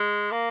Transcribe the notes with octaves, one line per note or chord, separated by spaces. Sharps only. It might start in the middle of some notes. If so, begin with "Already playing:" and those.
Already playing: G#3
A#3